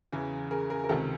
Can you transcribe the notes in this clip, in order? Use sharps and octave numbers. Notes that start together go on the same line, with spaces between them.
E2 C#3 E3
G#4 A#4
G#4 A#4
A#4
C#2 C3 D#3 G4 A4